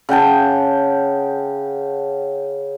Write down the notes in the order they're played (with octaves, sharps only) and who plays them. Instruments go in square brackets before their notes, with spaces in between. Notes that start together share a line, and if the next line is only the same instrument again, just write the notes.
[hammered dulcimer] C#3 F#5 G5 A5